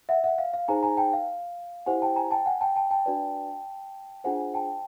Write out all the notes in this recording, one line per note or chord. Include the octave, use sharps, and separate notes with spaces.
E5 F#5
E5 F#5
F5
F5
D#4 G#4 C5 G#5 A#5
G#5 A#5
G5 A5
F5
E4 G4 C5 F#5 G#5
G5 A5
G#5 A#5
G5 A5
F#5 G#5
G5 A5
G5 A5
G5 A5
D4 F#4 B4 D5
D4 F4 G#4 C5 F#5 G#5
G5 A5